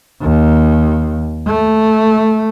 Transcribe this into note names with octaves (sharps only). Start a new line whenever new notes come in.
D#2
A3